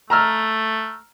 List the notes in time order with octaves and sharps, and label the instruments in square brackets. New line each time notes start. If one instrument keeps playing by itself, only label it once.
[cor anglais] A3 [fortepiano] A#5 E6 F6